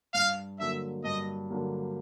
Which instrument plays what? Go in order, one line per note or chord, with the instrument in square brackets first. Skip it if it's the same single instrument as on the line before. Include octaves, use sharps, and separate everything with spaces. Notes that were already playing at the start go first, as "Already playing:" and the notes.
[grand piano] G2 [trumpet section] F5
[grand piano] D3 F#3 A#3 [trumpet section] E5
[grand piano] G2 [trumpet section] D#5
[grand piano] D3 F#3 A#3